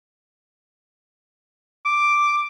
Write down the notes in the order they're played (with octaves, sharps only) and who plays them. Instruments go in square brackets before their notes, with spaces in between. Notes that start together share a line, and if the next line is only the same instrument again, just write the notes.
[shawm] D6